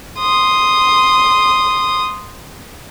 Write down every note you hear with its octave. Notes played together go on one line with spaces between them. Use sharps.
C6 D#6